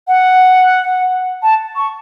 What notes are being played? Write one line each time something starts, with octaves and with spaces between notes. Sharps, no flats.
F#5
A5
C#6